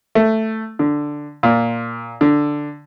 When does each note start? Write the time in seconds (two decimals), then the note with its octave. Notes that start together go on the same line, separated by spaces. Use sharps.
0.15 A3
0.79 D3
1.43 A#2
2.21 D3